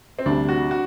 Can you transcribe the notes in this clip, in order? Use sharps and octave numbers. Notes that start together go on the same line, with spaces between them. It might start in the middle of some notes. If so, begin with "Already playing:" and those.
C4
D2 C3 G3 D4
F#4
F#4